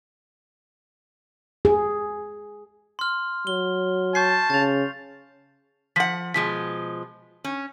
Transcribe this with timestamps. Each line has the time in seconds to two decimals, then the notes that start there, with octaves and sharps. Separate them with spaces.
1.65 G#4
2.99 C6 F6
3.47 F#3 G7
4.15 A5 C#6 G6 C7
4.50 C#3 A6 F7
5.96 F3 F#5 B6
6.34 B2 F3 G#3 B6
7.44 C#4